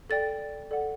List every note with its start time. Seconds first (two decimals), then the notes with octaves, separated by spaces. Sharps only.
0.10 A4 D5 G5 A6
0.71 A4 D5 F#5